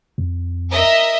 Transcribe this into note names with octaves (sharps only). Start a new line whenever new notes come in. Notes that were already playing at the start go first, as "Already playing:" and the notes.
F2
A#4 D#5 E5